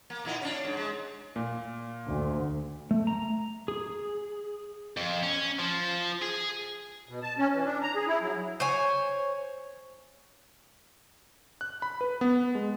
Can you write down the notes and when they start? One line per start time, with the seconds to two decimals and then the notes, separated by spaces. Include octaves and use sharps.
0.10 A#3
0.25 A#2 D#4 E4
0.41 C#4 D4
0.65 G#2
0.77 G#3
1.36 A#2
2.07 D2
2.91 A3
3.07 A#5
3.68 G#4
4.97 F2
5.23 C#4
5.59 F3
6.22 G#4
7.09 B2
7.23 A5
7.39 C#4
7.54 E3
7.65 D4
7.82 A#5
7.96 G#4
8.07 E4
8.22 F#3
8.60 C5 C#5 G#5
11.61 F#6
11.82 B5
12.01 B4
12.21 B3
12.55 G#3